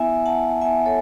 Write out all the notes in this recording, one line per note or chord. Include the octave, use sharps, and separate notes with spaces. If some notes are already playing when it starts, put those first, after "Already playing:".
Already playing: B3 E4 E5 G#5
F#5 A5
B3 E4 E5 G#5
A4 C#5